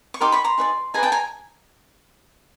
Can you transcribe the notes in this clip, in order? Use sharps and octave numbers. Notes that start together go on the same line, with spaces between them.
C#6
D#4 G4 A#4 C6 D6
B5 C#6
A#5 C6
D#4 G#4 B4 D5
D#4 G#4 B4 D5 G#5 A#5
G5 A5
G#5 A#5